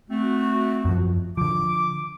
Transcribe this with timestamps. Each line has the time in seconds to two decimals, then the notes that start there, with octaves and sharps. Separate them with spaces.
0.10 A3 C4 F#4
0.85 F#2 F3
1.37 D3 F3 D6